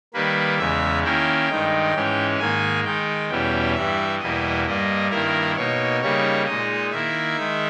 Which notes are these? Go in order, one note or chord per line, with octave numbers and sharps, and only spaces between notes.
D#3 G3 A#3 B4
E2 C#3 G#3 E5
D#3 A#3 C#4 E4 G5
G2 D#3 G#3 D#4
G#2 E3 G#3 C#4
G#2 D#3 A#3 G#5
D#3 G#3 D#4 G5
E2 B2 G3 C#4 E4 G5
G2 E3 G3 E5
E2 B2 G3 A#3 E4 D#5
G2 G3 A#3 D#5
G2 D#3 A#3 E4 A#4
B2 A#3 D#4 C#5
C#3 G3 A#3 D#4 C#5
A#2 G#3 D#4 D#5
D#3 A#3 E4 E5
D#3 G#3 D#4